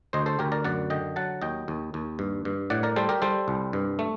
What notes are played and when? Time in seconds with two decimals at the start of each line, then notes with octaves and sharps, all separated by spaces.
0.13 D2 C5 D#5
0.26 A4 C5
0.39 D2 G4 A#4
0.52 A#4 D5
0.65 F#2 D5 F#5
0.90 D3 D#5 G5
1.16 F#3 F#5 A5
1.42 D#2 D#5 G5
1.68 D#2
1.94 D#2
2.19 G2
2.45 G2
2.70 A2 D5 F#5
2.83 A#4 D5
2.96 G3 A4 C5
3.09 G4 A#4
3.22 G3 A4 C5
3.48 C2
3.73 G2
3.99 A3